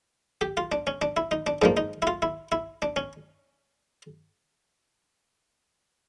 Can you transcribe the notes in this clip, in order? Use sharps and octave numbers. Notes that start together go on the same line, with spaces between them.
G4
F4
D4
C#4
D4
E4
D#4
D4
G#2 F3 A#3 D4
D#4
E4
F4
E4
E4
D4
C#4